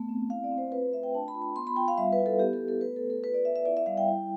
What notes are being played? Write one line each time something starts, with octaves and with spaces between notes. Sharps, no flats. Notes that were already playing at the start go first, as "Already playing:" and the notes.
Already playing: A3 B3
C4
E4 F5
D5
C4
C5
F4 B4
A3 E5
G5
D4 A5
B5
F4
B5
B3 C6
B5
F4 G5
F5
G3 E5
B4
E4
A4
B3 G4
A4
B3
A4
A3 B4
A4
A3
A4
F4 B4
D5
B3 E5
E5
E4 D5
E5
G3 F5
G5
E4